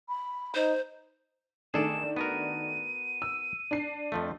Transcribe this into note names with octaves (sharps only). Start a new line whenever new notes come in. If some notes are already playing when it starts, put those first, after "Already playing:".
B5
D#4 C5
D#3 A3 D4 G#4 A4 D5 E7
B3 F#4 A#4 D#7
E6
D4 C7
F2 F3 A3